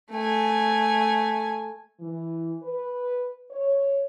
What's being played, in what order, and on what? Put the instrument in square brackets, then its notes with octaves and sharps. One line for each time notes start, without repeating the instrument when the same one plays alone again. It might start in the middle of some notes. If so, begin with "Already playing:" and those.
[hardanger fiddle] A3 G#5
[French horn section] E3
B4
C#5